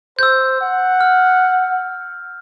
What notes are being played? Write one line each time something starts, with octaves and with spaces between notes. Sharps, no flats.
C5 E6 G6
F#5
F6